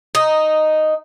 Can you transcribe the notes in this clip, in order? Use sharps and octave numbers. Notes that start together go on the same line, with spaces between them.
D#4